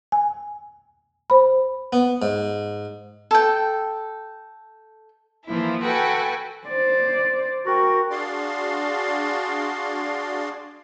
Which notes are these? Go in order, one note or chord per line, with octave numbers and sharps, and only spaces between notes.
G#5
C5 B5
B3
G#2
A4 G5
E3 F3 A#3 E4
F#4 A4 B4 G5 G#5
C5 D5
F#4 A#4 G5
D4 F#4 G#4 D5 F5 C6